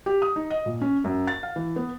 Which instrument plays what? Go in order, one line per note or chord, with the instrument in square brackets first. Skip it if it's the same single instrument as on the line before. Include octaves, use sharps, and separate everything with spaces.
[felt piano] G4
D#6
D#4
D#5
A#2
C#4
F#2
A6
F5
E3
B3